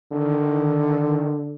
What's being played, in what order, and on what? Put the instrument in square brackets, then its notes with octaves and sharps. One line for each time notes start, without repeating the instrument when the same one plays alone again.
[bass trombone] D3 [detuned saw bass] D#3